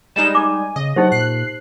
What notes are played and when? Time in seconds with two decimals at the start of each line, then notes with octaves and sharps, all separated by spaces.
0.16 G3 G#3 D#4 E7
0.35 G#5 D6
0.76 C#3 D#5
0.96 F#3 D#4 G4 C5 F#5
1.12 A#2 F#6 C7